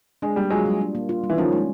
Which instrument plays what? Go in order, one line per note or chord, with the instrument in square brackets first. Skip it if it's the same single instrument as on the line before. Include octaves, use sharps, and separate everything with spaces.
[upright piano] G#3 [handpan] D4
[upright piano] G3 [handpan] A#3
[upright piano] F#3 G#3 [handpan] F4
[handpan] G3
D4
A#3
F4
G3
[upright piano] E3
[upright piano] D#3 F3 [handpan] C#4
[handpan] G#3